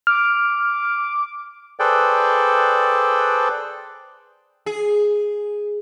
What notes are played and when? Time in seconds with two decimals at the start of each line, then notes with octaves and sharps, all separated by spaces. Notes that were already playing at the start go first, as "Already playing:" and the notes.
0.07 D6 F6
1.80 G#4 A4 B4 C5 D5 G5
4.66 G#4